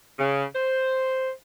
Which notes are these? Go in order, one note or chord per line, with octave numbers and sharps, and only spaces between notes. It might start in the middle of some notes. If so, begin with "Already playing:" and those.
C#3
C5